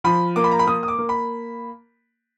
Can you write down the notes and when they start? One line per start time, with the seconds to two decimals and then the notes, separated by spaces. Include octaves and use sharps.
0.04 F3 B5
0.36 A#3 D6
0.44 B5
0.51 A#5
0.59 B5
0.67 A#3 D#6
0.83 D#6
0.88 D6
0.98 A#3
1.09 B5